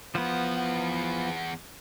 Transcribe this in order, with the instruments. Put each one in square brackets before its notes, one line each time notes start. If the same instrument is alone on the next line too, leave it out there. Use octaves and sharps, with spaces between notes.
[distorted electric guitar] E2 F#5 [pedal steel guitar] F3 B3